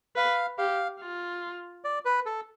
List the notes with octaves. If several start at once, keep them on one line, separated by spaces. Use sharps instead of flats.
B4 F5
G4 F5
F4
D5
B4
A4